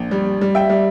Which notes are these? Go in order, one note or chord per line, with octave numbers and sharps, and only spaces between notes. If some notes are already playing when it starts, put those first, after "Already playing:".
Already playing: A#1
G3
G3
E5 G5
G3